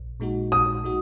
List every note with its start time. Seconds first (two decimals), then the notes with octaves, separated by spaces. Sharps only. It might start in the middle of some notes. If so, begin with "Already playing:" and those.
Already playing: A#1
0.20 A#2 G#3 D#4 F#4
0.51 A#1 D#6
0.84 A#2 G#3 D#4 F#4